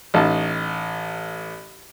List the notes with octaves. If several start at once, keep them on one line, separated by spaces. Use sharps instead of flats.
A1 D#4 A5